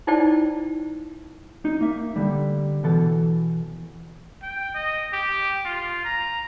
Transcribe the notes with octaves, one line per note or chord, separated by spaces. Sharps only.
D#4 E4 C5 D5 G5 A5
D#4
A#3 E5
D3 G3
B2 E3 A4 A5
G5
D#5
G4
F4
A#5